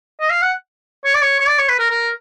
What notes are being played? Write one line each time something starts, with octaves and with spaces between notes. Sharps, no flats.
D#5
F5
F#5
C#5
D5
C#5
C#5
D5
C#5
B4
A#4
A#4